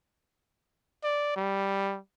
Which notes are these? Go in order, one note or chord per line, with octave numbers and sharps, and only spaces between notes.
D5
G3